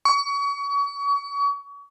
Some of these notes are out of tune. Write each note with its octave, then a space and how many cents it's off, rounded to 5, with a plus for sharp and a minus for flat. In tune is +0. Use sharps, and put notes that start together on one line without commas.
C#6 +30